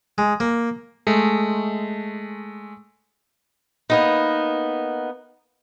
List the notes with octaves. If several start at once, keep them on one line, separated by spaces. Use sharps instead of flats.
G#3
A#3
G#3 A3
A#3 B3 D#4